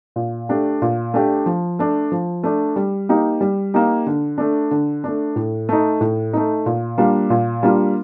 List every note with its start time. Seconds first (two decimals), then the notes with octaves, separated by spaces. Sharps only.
0.16 A#2
0.49 A3 D4 G4
0.82 A#2
1.14 A3 D4 G4
1.46 F3
1.79 A3 D4
2.12 F3
2.43 A3 D4
2.76 G3
3.09 A#3 D#4 G4
3.41 G3
3.74 A#3 D#4 G4
4.06 D3
4.38 A3 D4
4.71 D3
5.04 A3 D4
5.36 A2
5.69 A3 D#4
6.01 A2
6.33 A3 D#4
6.66 A#2
6.98 G3 A#3 D4 F4
7.30 A#2
7.63 G3 A#3 D4 F4